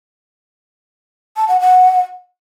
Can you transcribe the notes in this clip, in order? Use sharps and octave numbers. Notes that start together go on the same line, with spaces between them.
A5
F#5
F#5